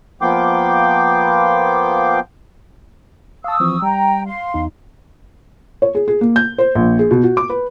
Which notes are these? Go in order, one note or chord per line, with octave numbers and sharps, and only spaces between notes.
F3 A#3 B3 G5 C6 D6
F5 A5 C#6 D#6 E6
E3 F3 C4
G3 G5 A#5
F5 C6
E2 D#4
C#5
G#4
G#4
A#3
G6
C5
A#1
G#4
B2
F#4
D6
B4